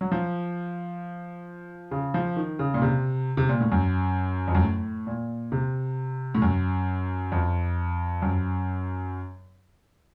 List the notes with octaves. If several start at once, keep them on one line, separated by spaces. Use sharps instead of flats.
F#3
F3
C#3
F3
D#3
C#3
A#2
C3
C3
A#2
A2
F#2
F2
F#2
A2
A#2
C3
A2
F#2
F2
F#2